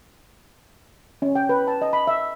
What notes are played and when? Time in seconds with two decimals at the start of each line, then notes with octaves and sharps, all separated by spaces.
1.22 C#4
1.35 G5
1.49 B4
1.68 A5
1.82 D#5
1.93 B5
2.07 E5